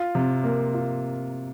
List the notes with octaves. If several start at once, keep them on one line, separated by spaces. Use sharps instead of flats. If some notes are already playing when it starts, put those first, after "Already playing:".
Already playing: F4
C3
A#3
F4